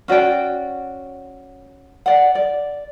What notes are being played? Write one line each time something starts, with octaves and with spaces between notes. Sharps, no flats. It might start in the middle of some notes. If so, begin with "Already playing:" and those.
C#4 F#4 D5 G5
D5 F#5
D5